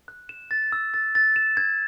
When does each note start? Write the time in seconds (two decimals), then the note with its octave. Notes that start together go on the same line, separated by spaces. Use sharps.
0.08 F#6
0.29 E7
0.51 A6
0.72 E6
0.94 A6
1.15 A6
1.36 E7
1.57 G#6